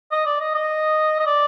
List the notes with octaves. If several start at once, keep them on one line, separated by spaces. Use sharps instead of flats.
D#5
D5
D#5
D#5
D#5
D5